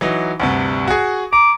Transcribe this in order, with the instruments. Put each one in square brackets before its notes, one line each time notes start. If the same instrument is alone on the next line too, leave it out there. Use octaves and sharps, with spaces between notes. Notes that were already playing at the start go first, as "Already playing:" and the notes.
[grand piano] E3 F#3 D#4
D2 G2 C3
F#4 G#4
[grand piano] A#5 [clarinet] D6